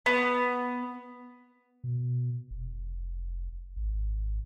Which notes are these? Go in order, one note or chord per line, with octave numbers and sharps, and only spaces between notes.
B3
B2
F1
G#1